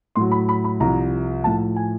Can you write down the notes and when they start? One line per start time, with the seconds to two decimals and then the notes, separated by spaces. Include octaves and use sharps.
0.15 A2 F#3 C6
0.32 B5
0.49 B5
0.64 B5
0.80 C2 C3 F3 A#5
1.44 A2 F3 A5
1.76 G#5